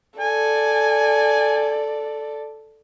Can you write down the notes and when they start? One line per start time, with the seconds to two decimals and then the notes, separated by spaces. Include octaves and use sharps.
0.20 A4 D5 G#5